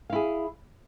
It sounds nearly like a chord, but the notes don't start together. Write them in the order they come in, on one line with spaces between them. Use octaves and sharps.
F5 E4 G#4